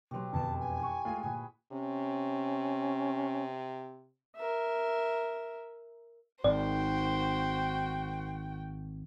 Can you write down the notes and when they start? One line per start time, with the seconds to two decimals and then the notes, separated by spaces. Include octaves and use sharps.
0.11 B2 F#3 G4 C5
0.32 E1 F2 B2 A5
0.60 G#5
0.79 E3 C#6
1.05 G#3 A3 F4
1.23 A#2 G#4 B4 G5
1.72 C3 C#4
4.36 A#4 E5
6.44 G#1 F#4 C5 D5 G5